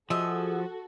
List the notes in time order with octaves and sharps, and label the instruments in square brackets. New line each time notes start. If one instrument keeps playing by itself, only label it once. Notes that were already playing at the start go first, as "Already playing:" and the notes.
[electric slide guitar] F3 [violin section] F#4 A4 [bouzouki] G#4 D#5 E5